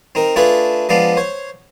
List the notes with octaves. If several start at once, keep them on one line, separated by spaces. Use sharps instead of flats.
C4 D#4 A#4
A3 D4 F4 G#4 A4 B4
F3 G#3 B3 D4 D5 F5
C5 C#5